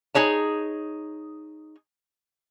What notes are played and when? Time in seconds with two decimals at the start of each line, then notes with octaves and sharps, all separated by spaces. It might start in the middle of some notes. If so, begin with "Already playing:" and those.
0.15 D#4 G#4 C#5 A5